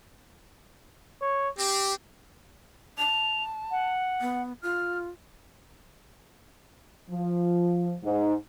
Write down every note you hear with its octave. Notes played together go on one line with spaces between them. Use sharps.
C#5
C4 G4
A5 F7
F#5
B3
F4 F6
F3
G#2